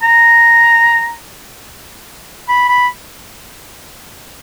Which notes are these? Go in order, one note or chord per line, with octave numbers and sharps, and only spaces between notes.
A#5
B5
B5